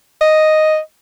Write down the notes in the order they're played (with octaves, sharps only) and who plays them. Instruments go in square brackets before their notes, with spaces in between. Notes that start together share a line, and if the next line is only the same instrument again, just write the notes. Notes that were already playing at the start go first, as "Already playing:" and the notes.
[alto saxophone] D#5